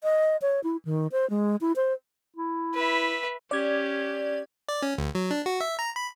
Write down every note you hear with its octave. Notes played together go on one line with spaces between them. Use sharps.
D#5
C#5
E4
D#3
C5
G#3
E4
C5
E4
B4 E5
C#4 G4 D5 G#6
D5
C#4
D2
F#3
D4
F#4
E5
A#5
B5